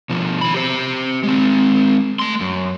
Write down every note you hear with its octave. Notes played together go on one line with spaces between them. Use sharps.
B2 F3
D#3 B5
G4 C5
G#3 C4
A3 C6
F#2